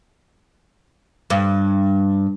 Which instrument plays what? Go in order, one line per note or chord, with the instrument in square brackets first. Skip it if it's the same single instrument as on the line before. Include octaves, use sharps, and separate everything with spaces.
[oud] G2